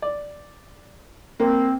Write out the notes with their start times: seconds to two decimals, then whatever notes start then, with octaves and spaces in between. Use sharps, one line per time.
0.02 D5
1.40 A#3 C4